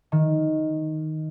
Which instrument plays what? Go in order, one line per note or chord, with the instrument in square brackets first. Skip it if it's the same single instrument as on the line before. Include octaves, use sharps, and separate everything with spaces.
[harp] D#3